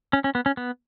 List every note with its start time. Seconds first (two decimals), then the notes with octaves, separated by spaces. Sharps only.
0.13 C#4
0.24 C#4
0.35 B3
0.46 C#4
0.57 B3